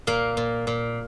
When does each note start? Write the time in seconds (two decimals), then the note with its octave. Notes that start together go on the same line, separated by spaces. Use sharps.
0.07 A#2 A#3
0.37 A#2
0.67 A#2